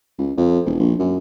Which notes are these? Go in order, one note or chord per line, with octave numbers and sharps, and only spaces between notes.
C#2
F2
E1
A#1
F#2